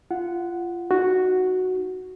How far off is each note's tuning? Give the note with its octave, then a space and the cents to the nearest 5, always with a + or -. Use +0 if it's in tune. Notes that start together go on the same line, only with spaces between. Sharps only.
F4 -20 F#5 +0
D#4 +0 F#4 +0